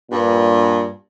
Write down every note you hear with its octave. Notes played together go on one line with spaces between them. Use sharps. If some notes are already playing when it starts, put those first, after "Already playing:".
G2 A#2